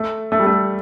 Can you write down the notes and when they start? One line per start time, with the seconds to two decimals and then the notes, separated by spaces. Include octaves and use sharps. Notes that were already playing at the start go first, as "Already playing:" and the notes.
Already playing: A3
0.32 A3
0.40 G3
0.46 A3